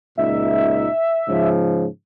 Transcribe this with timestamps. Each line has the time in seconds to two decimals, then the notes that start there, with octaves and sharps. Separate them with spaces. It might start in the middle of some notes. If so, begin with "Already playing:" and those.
0.17 C#2 A#2 D#4 E5
1.28 G#2 C#3 F3